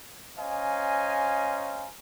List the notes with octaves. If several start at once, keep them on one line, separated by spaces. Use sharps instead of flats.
C#4 C5 D#5 F5 G#5 A#5